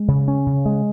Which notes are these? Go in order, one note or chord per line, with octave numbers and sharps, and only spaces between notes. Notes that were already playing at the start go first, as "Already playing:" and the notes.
Already playing: G#3
C#3
C#4
C#3
G#3